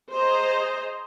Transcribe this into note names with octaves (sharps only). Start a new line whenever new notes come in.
G#4 C5 D#5 A#5